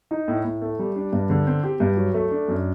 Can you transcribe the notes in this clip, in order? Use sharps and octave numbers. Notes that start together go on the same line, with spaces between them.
D#4
A2
A2
A3
G3
D4
G2
D3
C4
G4
G2
F#3
A3
D4
F#2